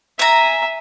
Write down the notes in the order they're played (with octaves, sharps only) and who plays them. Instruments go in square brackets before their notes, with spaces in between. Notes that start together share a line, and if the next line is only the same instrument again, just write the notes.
[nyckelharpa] E5 [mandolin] G#5 A#5